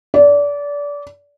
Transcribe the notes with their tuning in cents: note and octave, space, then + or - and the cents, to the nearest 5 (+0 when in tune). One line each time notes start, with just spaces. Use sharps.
D5 -25